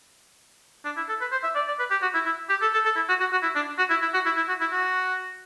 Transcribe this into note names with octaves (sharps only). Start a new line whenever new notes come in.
D4
E4
A4
B4
C5
E5
D5
D5
B4
G4
F#4
E4
E4
G4
A4
A4
A4
E4
F#4
F#4
F#4
E4
D4
F#4
E4
E4
F#4
E4
E4
F#4
E4
F#4